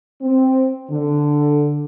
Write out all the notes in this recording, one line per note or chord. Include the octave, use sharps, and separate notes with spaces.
C4
D3